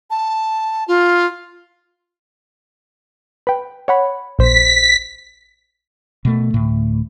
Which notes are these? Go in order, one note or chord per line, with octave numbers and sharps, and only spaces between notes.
A5
F4
B4 G5
C#5 F#5 B5
A#1 C5 B6
B2 A3
D2 A2